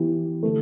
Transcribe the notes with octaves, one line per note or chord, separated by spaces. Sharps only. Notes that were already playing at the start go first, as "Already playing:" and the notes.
Already playing: E3 B3 E4 G4
D3 A3